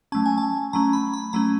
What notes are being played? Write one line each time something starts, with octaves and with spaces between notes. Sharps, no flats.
F#3 A3 C#4 A5
G#5
A5
F#3 A3 C#4 A#5
B5
B5
F#3 A3 C#4 A#5